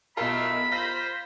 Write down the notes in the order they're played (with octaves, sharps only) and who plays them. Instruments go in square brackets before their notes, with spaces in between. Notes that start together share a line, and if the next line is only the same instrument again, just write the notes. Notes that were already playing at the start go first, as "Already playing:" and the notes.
[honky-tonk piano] B1 A#4 [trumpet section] A3 E4 [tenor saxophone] F4 [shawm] B5
[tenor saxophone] F4 [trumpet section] C5 [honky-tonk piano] A#6